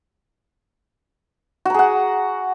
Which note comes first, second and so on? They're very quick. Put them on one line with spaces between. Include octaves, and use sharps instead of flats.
F#4 A#5 G#4 F#5